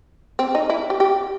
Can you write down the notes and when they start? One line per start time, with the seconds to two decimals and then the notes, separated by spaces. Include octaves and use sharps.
0.39 C4
0.55 D#4
0.70 E4
0.90 G4
1.00 G4